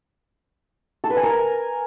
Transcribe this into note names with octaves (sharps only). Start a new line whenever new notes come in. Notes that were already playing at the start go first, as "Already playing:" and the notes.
A4
B4
G#5
A#4